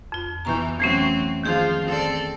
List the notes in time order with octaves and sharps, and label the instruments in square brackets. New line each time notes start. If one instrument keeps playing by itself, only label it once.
[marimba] F2 F4
[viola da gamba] B2 E3 [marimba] A#5 C#6 G6
[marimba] E3 A3 C#4 [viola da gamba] F#3 C4
[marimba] D#3 G#4 G6 [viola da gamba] F3 F4
[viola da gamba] C4 A4 D5